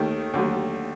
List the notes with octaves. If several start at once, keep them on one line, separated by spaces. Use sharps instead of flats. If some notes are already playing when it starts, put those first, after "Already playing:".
Already playing: D#2 D#3 A3
D#2 D3 F#3 A3